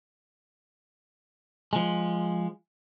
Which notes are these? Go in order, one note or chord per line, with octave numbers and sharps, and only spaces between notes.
F3 G#3